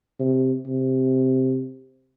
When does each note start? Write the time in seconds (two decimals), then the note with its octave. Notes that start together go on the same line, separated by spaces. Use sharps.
0.20 C3
0.66 C3